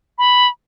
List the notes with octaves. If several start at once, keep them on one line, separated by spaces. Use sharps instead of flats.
B5